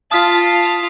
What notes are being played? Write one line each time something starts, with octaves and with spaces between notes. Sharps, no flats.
F4 A5 D#6 F6 B6